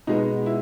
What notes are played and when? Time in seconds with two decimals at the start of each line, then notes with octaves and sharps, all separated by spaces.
0.07 B2 G#3 B3 D#4
0.46 E4